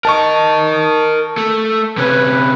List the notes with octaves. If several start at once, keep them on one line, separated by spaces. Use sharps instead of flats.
A#4 D#5 A5 C#6
A3
C3 C#4 B4